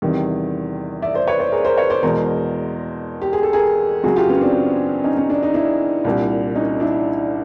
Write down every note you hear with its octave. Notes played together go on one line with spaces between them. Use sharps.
E2 C3 D#3 G3
D5 E5
C5 D5
B4 C#5
C5 D5
G#4 A#4
A#4 C5
B4 C#5
C5 D5
E2 B2 G#3 A#4 C5
G4
G#4
A4
G#4 A#4
F#2 C#3 F#3 F#4 G#4
F4 G4
B3 C#4
C4 D4
C#4 D#4
C#4
D4
D#4
D4 E4
C2 A#2 G3
C#4 D#4
D4 E4